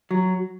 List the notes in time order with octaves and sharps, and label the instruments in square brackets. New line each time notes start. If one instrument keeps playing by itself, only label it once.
[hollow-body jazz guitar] F#3